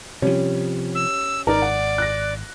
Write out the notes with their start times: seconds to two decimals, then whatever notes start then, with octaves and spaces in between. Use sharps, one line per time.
0.22 C3 F3 G3 C#4
0.95 E6
1.47 G#1 D#4 A#4 D5
1.62 F#5
1.98 F#6 A#6